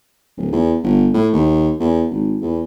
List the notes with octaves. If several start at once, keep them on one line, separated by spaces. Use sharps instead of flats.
D1
E2
G1
A2
D#2
E2
G#1
E2